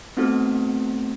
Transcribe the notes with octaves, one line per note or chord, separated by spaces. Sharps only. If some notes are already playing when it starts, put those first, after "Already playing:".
A3 B3 C4 D#4 F#4 A4